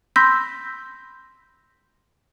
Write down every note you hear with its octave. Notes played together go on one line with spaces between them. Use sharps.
B5 C6 E6 G6 A#6 B6